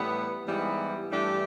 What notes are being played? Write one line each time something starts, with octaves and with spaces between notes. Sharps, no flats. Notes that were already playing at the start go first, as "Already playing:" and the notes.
Already playing: A2 E3 G3 B3 E4
G#2 E3 G3 B3
G2 E3 A3 D4 G4